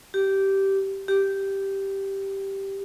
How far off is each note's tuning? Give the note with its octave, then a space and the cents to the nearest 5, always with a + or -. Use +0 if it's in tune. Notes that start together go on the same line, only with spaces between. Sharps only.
G4 -15
G4 -5